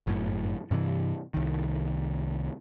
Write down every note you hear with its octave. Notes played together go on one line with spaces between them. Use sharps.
G1 F#2 A2
G2 C3 D#3 E3
C2 D#3